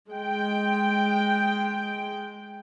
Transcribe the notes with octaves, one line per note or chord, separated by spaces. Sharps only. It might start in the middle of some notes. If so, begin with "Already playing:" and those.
G#3 G5